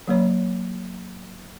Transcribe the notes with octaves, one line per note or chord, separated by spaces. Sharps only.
F#3 A#3 C#5